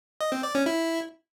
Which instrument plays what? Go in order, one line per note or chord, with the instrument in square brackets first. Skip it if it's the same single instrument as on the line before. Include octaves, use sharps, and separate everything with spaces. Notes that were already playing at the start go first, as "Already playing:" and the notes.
[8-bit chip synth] D#5
C4
D5
C#4
E4